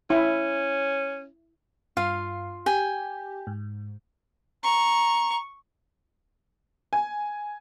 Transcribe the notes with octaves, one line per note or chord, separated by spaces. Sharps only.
C#4 E4
G2 F4 F5
G4 G5 G#5
G#2
A#5 C#6
G#5